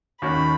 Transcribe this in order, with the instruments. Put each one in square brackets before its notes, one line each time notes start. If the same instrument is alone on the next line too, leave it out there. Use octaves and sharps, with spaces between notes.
[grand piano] D#2 D#3 A#3 C#4 F#4 [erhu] B5